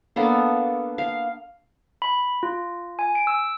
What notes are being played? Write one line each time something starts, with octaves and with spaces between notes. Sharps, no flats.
A#3 B3 D4 A4
F5
B5
F4
G#5
D7
E6